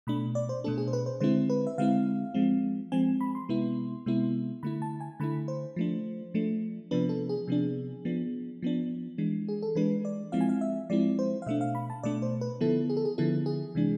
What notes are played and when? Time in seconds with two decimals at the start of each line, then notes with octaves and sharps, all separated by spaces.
0.07 B2 A3 D4 B5
0.35 D5
0.49 C5
0.64 B2 A3 D4 A4
0.78 G#4
0.88 C5
0.93 B4
1.06 C5
1.20 D3 G#3 C4 E4 C5
1.50 B4
1.67 E5
1.78 D3 G#3 C4 E4 F5
2.34 F3 G#3 C4
2.92 F3 G#3 C4 G#5
3.21 B5
3.35 C6
3.49 C3 G#3 B3 E4
4.06 C3 G#3 B3 E4
4.63 D3 A3 E4 B5
4.82 A5
5.00 G#5
5.20 D3 A3 E4 B5
5.48 C5
5.76 F3 A3 D4
6.34 F3 A3 D4
6.91 C3 F3 B3 D4 B4
7.09 A4
7.29 G#4
7.48 C3 F3 B3 D4
8.05 F3 B3 D4
8.62 F3 B3 D4
9.18 E3 G#3 D4
9.49 G#4
9.62 A4
9.75 E3 G#3 D4 B4
10.05 D5
10.32 F3 G#3 C4 E4 F5
10.41 G#5
10.49 F5
10.61 E5
10.90 F3 G#3 C4 E4 D5
11.19 C5
11.42 F5
11.46 B2 A3 D4 E5
11.61 F5
11.75 B5
11.90 A5
12.03 B2 A3 D4 D5
12.22 C5
12.41 B4
12.61 D3 F3 B3 E4 A4
12.90 G#4
12.97 A4
13.05 G#4
13.18 D3 F3 B3 E4 A4
13.46 G#4
13.75 C3 E3 G#3 D4